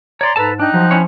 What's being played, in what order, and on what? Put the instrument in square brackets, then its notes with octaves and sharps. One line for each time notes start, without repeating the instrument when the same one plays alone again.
[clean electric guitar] C#5 D5 [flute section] A#5 C6
[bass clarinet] G#2 [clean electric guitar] A4 A5 [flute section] B4 A#5
[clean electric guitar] D4 [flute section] D#4 G5 F#6
[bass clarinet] F3 [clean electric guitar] F#3
[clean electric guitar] C#4 E4 C#5